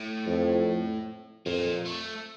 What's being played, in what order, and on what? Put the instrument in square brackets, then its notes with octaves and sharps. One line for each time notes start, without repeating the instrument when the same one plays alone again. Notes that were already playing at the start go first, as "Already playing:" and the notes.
Already playing: [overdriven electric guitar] A2
[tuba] F2
[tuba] F2 [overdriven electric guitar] A#2
[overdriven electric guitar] A3